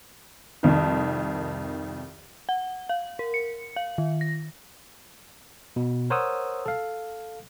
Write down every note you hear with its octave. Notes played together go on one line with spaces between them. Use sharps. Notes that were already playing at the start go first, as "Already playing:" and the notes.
C2 F2 D#3
F#5
F5
A#4
C#7
F5
D#3
A#6
B2
A#4 C5 C#5 F#5 D#6 E6
A4 F5